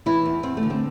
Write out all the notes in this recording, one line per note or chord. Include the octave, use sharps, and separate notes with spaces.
E3 E4
E2
E2 C4
A3
D3
C4